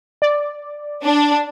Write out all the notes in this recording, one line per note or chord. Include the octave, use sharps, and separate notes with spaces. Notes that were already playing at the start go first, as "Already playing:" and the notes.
D5
D4